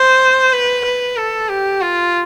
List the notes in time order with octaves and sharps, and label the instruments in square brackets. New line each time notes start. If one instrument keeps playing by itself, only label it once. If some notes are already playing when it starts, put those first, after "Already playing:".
Already playing: [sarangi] C5
B4
B4
A4
G4
F4